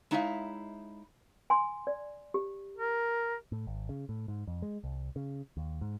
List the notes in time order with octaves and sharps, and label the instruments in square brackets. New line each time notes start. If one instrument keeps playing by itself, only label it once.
[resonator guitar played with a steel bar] G#3 D#4 E4 C#5 E5 F5
[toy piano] G#5 C6
D5
G4
[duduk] A#4
[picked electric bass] A2
G#1
C#3
A2
G#2
F2
G#3
C2
C#3
D#2
G#2